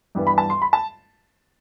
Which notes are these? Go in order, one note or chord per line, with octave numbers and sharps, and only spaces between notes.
G2 E3 G3 B3
B5
A5
C6
B5
A5